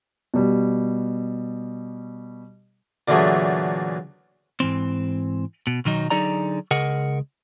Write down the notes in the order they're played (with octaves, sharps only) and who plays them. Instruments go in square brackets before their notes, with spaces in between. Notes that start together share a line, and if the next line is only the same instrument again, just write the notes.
[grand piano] B2 G3
[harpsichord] A#2 D3 E3 F#3 A3 G#4
[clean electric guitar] G#2 E3 C4
B2
B1 D#3 F#3 D#4
D3 F#3 D#4 G#4 D5 A#5
C#2 C#3 G#4 A#4 D#5 F#5